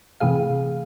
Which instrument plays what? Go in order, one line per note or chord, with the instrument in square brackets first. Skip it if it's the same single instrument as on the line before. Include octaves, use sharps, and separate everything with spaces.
[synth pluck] C3 E3 A3 G#4 F5